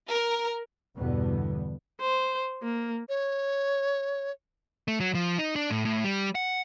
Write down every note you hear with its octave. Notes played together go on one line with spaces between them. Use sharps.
A#4
E2 G2 B2 D3 G3 B3
C5
A#3
C#5
A3
F#3
F3
D#4
D4
A2
A2
G3
F#5